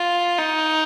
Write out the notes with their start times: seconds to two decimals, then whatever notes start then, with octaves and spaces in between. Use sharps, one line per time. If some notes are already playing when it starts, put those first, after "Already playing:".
Already playing: F4
0.38 D#4